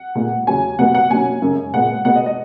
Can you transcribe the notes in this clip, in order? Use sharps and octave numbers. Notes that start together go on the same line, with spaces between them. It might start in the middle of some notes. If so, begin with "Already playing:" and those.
Already playing: F#5
A#2 G#3 B3
E2 C#3 F#3 C#4 G#5
B2 F#3 B3 F#5
F#5
B2 F#3 A#3 C#4 G#5
F#2 C#3 G#3
A#2 G#3 B3 F#5
B2 G#3 B3 F#5
D#5
D#5